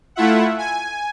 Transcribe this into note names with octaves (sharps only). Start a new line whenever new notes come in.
A3 E4 F4 E5 F#5
G#5